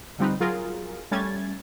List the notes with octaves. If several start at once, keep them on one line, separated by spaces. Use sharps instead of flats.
D3 F3 G3 C4 D#4 B4
F#3 F4 G#4 A#4
G3 A3 C#4 G#6 A6